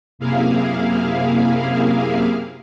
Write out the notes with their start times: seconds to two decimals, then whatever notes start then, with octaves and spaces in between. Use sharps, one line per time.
0.19 F#2 C3 A#3 E4 G#4 F5